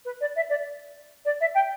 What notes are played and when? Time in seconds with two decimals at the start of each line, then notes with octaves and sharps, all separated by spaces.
0.05 B4
0.20 D5
0.35 E5
0.49 D5
1.25 D5
1.40 E5
1.54 G5